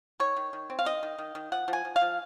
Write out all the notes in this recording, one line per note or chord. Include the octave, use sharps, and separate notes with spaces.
D#3 C#5
D#3
D#3
C4
F5
D#3 D#5
D#3
D#3
D#3
F3 F#5
F3
G#5
F3
F5
F3